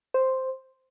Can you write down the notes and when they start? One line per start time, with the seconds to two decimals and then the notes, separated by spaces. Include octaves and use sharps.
0.14 C5